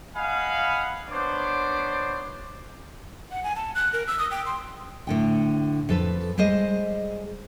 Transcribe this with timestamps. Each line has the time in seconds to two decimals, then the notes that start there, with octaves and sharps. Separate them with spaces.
0.16 D#5 F5 F#5 G#5 B5
1.08 B3 D4 C5 C#5 D6
3.31 F#5
3.44 G#5
3.56 A5
3.75 F#6
3.93 A#4
4.08 E6
4.19 D#6
4.31 G5
4.46 C6
5.07 A2 D3 G5
5.89 F2 A4 B4
6.38 G3 G#3 G#4 C5 D#5